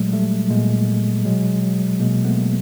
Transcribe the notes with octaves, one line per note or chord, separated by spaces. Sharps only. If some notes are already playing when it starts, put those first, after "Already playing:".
Already playing: A#2 F#3 G#3 A3
G3 A3
A#2 G#3 A#3
B2 F#3 G#3
F#3
B2 G#3 A#3
A3 B3